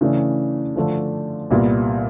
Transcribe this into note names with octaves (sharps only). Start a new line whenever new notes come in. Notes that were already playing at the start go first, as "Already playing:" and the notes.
C#3 E3 A3 D4
D3 F3 A3 D4
C2 A#2 G3 B3